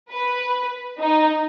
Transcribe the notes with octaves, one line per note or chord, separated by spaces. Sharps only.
B4
D#4